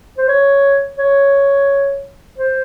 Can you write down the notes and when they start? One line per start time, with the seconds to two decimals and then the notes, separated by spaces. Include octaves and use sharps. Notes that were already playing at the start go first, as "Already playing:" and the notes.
0.18 C5
0.29 C#5
0.98 C#5
2.38 C5